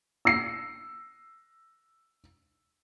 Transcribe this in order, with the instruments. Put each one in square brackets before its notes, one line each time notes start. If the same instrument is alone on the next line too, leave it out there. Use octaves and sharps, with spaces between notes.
[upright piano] E6 A#6 C7